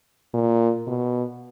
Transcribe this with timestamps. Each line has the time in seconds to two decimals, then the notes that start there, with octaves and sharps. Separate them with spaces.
0.34 A#2
0.87 B2